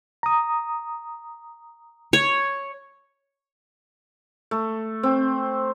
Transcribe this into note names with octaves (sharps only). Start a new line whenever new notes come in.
A#5 D#6
C#5
A3
C4